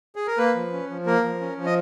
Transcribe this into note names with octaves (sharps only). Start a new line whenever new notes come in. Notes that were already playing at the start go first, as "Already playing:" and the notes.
G#4
A#4
A#3 B4
F3
C#4
F3
A#3 A#4
F3
C#4
F3
D#5